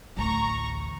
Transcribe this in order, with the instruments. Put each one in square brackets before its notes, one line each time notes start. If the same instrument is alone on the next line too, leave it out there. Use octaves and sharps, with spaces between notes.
[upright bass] A1 D2 [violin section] A#5 C#6